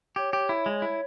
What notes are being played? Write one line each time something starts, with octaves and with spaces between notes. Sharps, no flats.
G4 C#5
G4
E4
G#3
E4